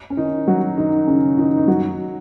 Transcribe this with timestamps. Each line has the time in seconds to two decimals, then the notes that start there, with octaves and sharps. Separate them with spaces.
0.10 C#4
0.17 D#3 D#4
0.47 F#3 F#4
0.78 D#3 D#4
1.07 C#3 C#4
1.38 D#3 D#4
1.57 D#4
1.68 F#3 F#4